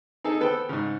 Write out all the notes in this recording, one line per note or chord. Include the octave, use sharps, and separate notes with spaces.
D#4 G#4 A4
B3 A4 B4 C5 G5
G#2 C#3